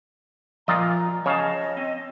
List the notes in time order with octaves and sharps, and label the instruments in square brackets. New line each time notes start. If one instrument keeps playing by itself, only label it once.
[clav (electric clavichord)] A#2 F4 D#5 [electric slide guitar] F3 [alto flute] A#5
[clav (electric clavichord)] C#3 [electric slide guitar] C#5 F5 A5 [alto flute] D#5
[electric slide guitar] C4